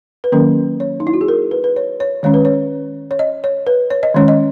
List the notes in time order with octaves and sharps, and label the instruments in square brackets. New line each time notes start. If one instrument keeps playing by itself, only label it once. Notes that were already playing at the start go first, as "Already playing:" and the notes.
[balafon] B4
D#3 F#3 A#3 C#4 A#4
C#5
D#4
E4
F#4
G#4
A#4
B4
B4
C#5
C#5
D#3 G#3 C#4 C#5
B4
C#5
C#5
D#5
C#5
B4
C#5
D#5
D#3 G#3 C#4 C#5
D#5